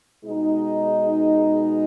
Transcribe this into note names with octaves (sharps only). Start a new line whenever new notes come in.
B2 G#3 D#4